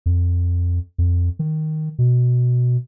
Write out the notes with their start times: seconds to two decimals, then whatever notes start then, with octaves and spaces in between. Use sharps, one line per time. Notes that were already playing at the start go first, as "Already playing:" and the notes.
0.06 F2
0.98 F2
1.39 D#3
1.99 B2